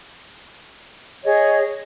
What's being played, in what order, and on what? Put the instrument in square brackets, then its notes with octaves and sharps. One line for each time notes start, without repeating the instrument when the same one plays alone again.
[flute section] G#4 C#5 D#5